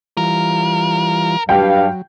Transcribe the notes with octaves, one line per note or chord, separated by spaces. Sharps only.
E3 G3 F4 A#4
G2 F#3 F5 G5